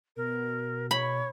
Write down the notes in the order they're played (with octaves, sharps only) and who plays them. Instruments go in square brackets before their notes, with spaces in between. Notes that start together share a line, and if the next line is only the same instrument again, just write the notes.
[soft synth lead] B2 [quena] A#4
[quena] C#5 [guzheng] B5